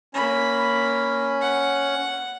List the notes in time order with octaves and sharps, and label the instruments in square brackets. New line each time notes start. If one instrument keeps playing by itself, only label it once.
[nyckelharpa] A#3 B5 [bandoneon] C#4
[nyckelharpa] F#5